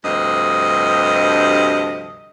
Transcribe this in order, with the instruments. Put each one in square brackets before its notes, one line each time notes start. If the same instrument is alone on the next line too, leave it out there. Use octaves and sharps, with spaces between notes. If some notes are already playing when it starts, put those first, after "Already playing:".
[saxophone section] D2 G2 C3 F3 D#5